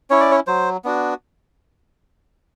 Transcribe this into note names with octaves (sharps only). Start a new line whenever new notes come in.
C#4 E4 C#5
D5
C#5
F#3 C5
B3 D4 F#4